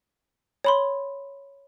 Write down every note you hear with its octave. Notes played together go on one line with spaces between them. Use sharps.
C#5 B5 C6